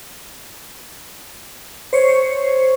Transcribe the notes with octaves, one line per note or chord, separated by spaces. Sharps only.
C5 C#5